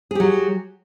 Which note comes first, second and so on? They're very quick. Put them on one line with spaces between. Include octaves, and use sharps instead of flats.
G#4 G4 F#3